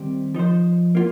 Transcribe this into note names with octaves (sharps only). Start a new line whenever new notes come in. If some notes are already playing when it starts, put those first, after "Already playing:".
Already playing: D#3 G3 C4 G4 C5
F3 D#4 C5
A#3 F4